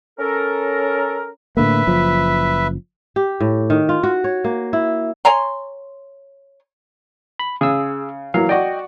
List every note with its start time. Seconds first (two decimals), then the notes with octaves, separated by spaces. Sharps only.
0.19 C#4 A4 A#4
1.57 A2 D3 A#3 B4 E5
1.87 F#1 F3
3.16 G4
3.40 A2
3.70 D#3
3.89 F4
4.03 F#4
4.24 C#5
4.45 A#3
4.73 E4
5.25 C#5 G#5 A#5 C6
7.39 B5
7.61 C#3 G#4 E6
8.34 E3 F#3 A#3 F5
8.49 F#4 D5 D#5 G5